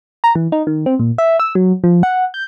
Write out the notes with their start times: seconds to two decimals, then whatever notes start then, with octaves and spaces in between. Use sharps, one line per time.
0.24 A#5
0.35 E3
0.52 D#4
0.67 D#3
0.86 C4
1.00 A#2
1.18 E5
1.40 E6
1.55 F#3
1.84 F3
2.03 F#5
2.34 G6